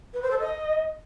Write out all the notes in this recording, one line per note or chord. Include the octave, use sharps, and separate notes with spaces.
B4
C5
A4
D#5